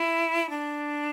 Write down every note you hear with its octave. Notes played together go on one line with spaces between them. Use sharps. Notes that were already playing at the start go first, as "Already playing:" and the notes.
Already playing: E4
D4